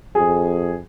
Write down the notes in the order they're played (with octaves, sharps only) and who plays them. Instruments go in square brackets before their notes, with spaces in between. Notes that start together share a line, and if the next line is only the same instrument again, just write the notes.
[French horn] F2 [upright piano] G#4